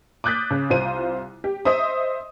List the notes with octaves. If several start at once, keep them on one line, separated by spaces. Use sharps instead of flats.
D6 D#6 F#6 G6 A6 B6
C#3
C2 F4 C5 D#7
G4
C5 D#5 E5 D#6